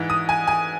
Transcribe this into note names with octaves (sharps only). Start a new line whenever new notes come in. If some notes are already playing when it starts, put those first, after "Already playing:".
Already playing: G#2 E3
D#6
G#5
G#5